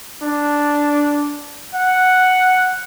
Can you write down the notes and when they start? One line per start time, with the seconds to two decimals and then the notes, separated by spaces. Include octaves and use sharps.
0.22 D4
1.74 F#5